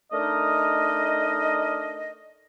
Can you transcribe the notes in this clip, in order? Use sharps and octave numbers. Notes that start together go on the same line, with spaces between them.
A3 D4 D#4 A#4 D#5